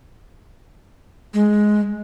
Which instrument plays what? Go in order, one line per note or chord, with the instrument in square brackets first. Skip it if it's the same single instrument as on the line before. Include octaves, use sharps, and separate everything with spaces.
[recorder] G#3